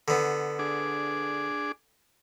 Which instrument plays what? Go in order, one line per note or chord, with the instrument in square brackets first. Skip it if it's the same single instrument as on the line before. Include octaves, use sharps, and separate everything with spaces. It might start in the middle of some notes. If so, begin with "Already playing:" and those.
[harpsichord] D3 B3
[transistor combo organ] D4 G#4 D6